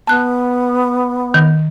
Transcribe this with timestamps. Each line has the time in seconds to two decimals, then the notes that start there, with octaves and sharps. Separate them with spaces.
0.07 B3 A5 F#6
1.34 D#3